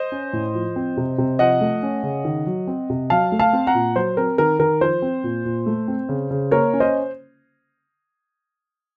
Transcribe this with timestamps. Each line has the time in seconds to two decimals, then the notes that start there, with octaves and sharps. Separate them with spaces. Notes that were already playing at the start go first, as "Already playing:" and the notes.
Already playing: C5 D#5
0.12 C#4
0.33 A2
0.54 F3
0.76 C4
0.97 C3
1.18 C3
1.39 F3 D#5 F#5
1.61 A3
1.83 C#4
2.03 C#3
2.25 D#3
2.47 F#3
2.67 C4
2.90 C3
3.10 F#3 F5 A5
3.32 A3
3.39 F5 A5
3.53 C4
3.67 F#5 A#5
3.74 A#2
3.96 F#3 C5
4.17 C4 A#4
4.38 D#3 A#4
4.59 D#3 A#4
4.81 F3 C5
5.02 C4
5.24 A#2
5.45 A#2
5.66 A3
5.88 C4
6.09 C#3
6.31 C#3
6.51 A#3 A#4 C#5
6.73 C#4
6.80 C5 D#5